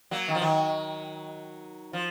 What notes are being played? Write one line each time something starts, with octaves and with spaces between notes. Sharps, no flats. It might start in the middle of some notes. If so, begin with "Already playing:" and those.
F#3 A#3
D#3
F3
D#3 F#3
F3